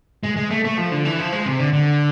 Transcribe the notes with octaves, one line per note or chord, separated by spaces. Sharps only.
G#3
G#3
A3
A3
F3
D3
E3
F3
G#3
C3
D3
D3